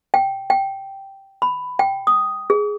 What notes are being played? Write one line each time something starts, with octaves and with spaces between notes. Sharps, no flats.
G5
G5
B5
G5
D#6
G#4